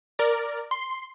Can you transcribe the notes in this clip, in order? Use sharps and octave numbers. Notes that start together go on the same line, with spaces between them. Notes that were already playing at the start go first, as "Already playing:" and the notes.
A#4 D5
C6